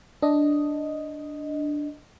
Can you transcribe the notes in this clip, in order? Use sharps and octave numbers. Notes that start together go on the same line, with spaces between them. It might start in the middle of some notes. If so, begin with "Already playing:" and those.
D4 D#5